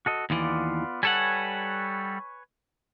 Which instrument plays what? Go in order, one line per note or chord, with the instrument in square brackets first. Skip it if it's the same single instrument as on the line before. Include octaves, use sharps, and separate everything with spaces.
[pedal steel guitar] F#4 A4 D#5
[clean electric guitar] D#2 E3 [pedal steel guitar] B3 F4 D5
[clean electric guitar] G3 A4 F#5 [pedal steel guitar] B4 C#5 G#5